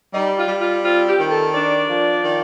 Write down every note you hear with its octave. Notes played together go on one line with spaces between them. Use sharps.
G3 D#4
F4
G3
F4
C4 F4
G4
D#3
A4
D4 D5
F3
D#3